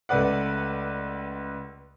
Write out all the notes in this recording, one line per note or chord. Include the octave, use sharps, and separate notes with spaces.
C#2 A3 B4 D5 F#5